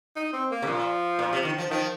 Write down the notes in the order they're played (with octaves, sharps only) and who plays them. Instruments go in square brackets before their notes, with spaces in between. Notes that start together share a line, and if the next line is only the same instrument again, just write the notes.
[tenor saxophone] D#4
C4
A#3
[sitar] C3
[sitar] A#2 [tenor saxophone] F3
[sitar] A#2
C3
D#3
F3
[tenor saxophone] D#3 [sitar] F3